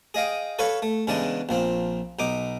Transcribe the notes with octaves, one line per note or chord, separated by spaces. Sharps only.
G#4 D#5 F5 G5
A4 B4 C#5 F5 B5 C#6
A3
E2 C#3 E3 G#3 D4 A5
A#1 F3 C4
B1 D#4 D6